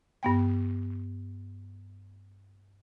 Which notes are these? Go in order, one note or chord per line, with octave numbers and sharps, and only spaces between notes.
G2 B3 G5